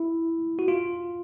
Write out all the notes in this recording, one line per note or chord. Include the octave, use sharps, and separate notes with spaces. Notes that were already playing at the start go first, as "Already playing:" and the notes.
Already playing: E4
F#4
F4